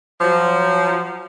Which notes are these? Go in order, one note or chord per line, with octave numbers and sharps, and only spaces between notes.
F3 F#3